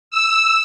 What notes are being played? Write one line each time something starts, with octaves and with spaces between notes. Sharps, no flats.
E6